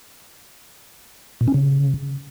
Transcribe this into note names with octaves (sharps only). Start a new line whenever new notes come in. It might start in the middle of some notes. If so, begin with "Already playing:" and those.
A#2
C#4
C#3